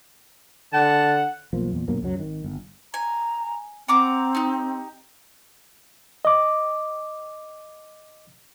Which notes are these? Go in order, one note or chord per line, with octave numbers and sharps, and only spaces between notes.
D3 F#5 A5
E1 B1 F3 A#3
E2 A#2
G2 B2 F#3 A#3
C#2 F#2 F#3
G#1 D#3
G1
G#5 A#5
C4 F#5 A#5 D6
D#4 G4
D#5 D6